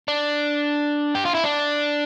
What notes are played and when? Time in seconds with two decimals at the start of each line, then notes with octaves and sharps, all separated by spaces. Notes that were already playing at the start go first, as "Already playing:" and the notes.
0.08 D4
1.15 G4
1.25 F4
1.34 E4
1.44 D4